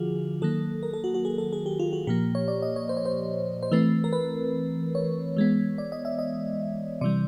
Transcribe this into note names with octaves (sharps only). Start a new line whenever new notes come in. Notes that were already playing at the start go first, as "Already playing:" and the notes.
Already playing: D3 F3 F4 F#4 G#4
D#3 F#3 A#3 A4
A#4
A4
F#4
F#4
G#4
A4
G#4
G4
F4
F#4
A#2 F3 A#3 G4
C#5
D5
D#5
C#5
C5
C#5
C5
C5
E3 A3 C4 B4
A#4
B4
C#5
E3 G#3 B3
D5
D#5
E5
D#5
C3 E3 G3 D5